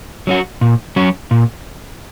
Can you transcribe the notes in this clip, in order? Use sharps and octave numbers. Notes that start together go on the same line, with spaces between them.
F#3 C#4 F#4
A#2
F#3 C#4 F#4
A#2